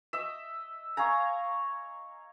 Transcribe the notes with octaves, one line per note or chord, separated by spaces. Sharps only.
D#5 E5
C#5 F5 G#5 A#5